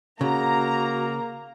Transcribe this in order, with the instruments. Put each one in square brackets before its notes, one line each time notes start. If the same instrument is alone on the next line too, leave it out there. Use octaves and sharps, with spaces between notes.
[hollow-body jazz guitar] C#3 [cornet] A#3 [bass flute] F#4 [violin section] A#5